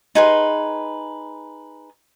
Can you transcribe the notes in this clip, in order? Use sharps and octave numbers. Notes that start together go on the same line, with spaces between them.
D#4 G#4 B4 C6